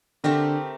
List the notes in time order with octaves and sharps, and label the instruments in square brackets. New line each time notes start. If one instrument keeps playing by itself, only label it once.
[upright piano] D3 [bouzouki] A3 C4 G4 A#4